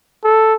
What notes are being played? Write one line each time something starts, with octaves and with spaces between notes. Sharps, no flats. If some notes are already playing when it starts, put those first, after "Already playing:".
A4